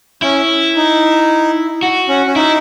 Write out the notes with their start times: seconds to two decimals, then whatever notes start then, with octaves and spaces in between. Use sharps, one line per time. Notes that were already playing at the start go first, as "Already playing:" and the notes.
0.22 C#4 E4
0.77 D#4
1.83 F#4
2.09 C#4
2.26 C#4
2.36 D#4 E4